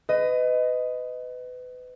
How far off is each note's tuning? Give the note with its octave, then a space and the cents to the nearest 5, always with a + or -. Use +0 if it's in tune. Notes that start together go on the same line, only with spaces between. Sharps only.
B4 +30 D#5 +0